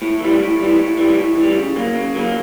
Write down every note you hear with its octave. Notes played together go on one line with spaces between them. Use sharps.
A2
E3 G3
A2
E3 G3
A2
E3 G3
A2
E3 G3
C#3
F#3 A#3
C#3
F#3 A#3